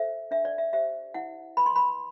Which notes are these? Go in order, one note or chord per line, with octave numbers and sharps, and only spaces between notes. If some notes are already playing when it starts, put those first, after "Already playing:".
Already playing: A4 C5 E5
D4 E5
D5
E5
G4 C5 E5
E4 F#5
B4 B5
C6
B5